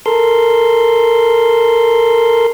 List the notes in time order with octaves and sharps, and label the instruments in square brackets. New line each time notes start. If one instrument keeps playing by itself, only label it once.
[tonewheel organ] A4 A#4 C6